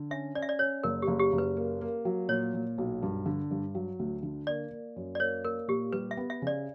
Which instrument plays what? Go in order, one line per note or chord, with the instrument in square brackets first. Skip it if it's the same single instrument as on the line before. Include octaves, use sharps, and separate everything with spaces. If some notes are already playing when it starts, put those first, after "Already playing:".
Already playing: [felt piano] D3
[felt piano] C#4 [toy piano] E5
[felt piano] C#4 [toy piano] D5
[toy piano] E5
D5
[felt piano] C#4 [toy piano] C#5
[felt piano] F#1 [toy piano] A#4
[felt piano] F#1 [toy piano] G4
[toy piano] G4
[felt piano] F#1
[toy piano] B4
[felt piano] A#3
A#3
F#3
[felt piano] A#2 [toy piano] C#5
[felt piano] A#2
B1
G2
D3
G2
F#3
D2
D3
[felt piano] A#3 [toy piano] D5
[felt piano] A#3
F#2
[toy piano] D5
[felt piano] A#3 [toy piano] C#5
[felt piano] A#3 [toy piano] A#4
[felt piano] A#2 [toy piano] G4
[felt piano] G3 [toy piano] B4
[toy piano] E5
[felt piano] B3
[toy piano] E5
[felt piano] C#3 [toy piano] D5